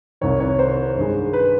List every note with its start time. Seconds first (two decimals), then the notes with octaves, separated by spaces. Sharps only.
0.21 C2 C3 D#3 C#5
0.40 C#5
0.59 C5
0.96 G2 D#3 G#3
1.33 B4